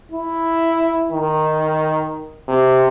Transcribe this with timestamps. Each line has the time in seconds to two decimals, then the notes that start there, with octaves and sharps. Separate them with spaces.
0.12 E4
1.12 D#3
2.48 C3